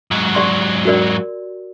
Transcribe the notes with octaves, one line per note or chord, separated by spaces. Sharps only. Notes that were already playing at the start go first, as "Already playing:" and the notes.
G#2 F#3
G4 D5 C6
F#4 A#4 D5